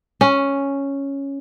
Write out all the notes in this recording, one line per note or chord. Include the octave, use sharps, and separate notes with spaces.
C#4